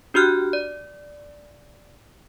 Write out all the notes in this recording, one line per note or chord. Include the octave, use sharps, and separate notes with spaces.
D4 F#4 G4 F6 F#6
D5